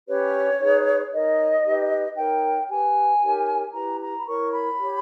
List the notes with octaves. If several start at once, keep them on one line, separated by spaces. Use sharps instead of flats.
C#4 G4 B4 C#5
D#4 G#4 B4
D#4 A#4 C#5 D#5
D#4 G4 B4
D#4 A#4 C#5 G5
G4 B4 G#5
D#4 G4 A#4 C#5
E4 G4 B4 A#5
A#5
B5
E4 A#4 C#5 C#6
B5
G4 C#5